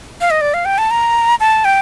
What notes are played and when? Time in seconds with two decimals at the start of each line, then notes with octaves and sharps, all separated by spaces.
0.21 F5
0.30 D#5
0.41 D5
0.54 F5
0.65 G5
0.78 A5
0.91 A#5
1.40 A5
1.65 G5